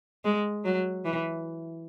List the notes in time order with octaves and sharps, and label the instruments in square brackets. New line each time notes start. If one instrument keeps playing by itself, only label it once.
[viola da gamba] G#3
F#3
E3